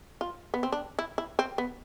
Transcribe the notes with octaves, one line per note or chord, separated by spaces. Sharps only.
F4
B3
C4
D4
E4
E4
C4
B3